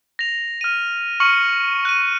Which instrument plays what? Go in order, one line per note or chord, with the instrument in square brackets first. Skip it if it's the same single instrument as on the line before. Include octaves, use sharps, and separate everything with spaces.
[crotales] A#6 F7
F6 D#7
C#6 F6 C#7 F#7
F#6 D#7